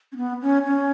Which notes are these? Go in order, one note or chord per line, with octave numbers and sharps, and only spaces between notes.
C#4
B3
C#4
C#4